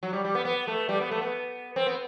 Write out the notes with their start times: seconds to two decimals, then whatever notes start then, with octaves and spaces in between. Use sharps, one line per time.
0.03 F#3
0.13 G3
0.24 G3
0.35 B3
0.45 B3
0.68 A3
0.89 G3
1.01 B3
1.11 A3
1.21 B3
1.76 C4
1.86 B3